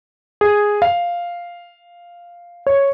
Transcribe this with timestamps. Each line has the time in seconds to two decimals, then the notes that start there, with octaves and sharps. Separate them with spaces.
0.41 G#4
0.82 F5
2.67 C#5